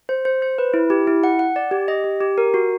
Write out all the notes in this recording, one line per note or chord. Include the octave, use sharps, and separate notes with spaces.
C5
C5
C5
B4
E4
G4
E4
F#5
F#5
D5
G4
D#5
G4
G4
A#4
F#4